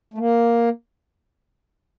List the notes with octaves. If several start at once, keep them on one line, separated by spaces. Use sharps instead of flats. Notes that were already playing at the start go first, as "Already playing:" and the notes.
A3
A#3